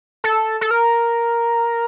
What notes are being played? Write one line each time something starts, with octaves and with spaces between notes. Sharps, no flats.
A4
A4
A#4